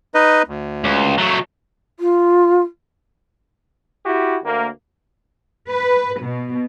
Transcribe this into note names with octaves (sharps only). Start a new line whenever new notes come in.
D#4 B4 D#5
D2
C#2
F#3 A3
F4
E4 F#4 G4
D2 A#3
B4
B2